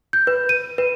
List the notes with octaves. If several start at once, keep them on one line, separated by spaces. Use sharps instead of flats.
G6
B4
D#7
B4